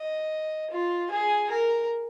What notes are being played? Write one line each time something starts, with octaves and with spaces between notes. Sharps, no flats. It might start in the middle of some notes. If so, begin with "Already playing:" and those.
Already playing: D#5
F4
G#4
A#4